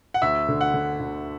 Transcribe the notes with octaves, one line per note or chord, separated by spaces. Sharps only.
F#5
D2 E5
D3
F#5
D3
D2